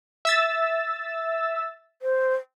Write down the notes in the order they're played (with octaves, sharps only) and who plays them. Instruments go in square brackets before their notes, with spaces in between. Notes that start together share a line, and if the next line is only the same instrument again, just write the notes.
[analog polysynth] E5 E6 A6
[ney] C5